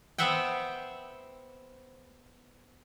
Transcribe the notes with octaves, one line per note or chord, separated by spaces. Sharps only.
B3 C4 C5 E5 F#5 G5